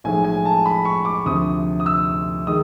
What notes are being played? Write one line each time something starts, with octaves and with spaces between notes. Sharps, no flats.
B1 A2 F3 G#3 G#5
G#5
A5
B5
C#6
D6
D2 C3 F3 D#6
D#6
E6
D#3 G#3 D#6